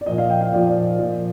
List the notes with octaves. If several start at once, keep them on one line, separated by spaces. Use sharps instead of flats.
D5
A#2 F3 D#5
F5
G5
F5
A#2 F3 D5
A#2 F3